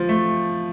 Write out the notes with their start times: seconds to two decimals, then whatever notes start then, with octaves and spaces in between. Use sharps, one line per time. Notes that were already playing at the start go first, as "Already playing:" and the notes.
Already playing: F3
0.09 A3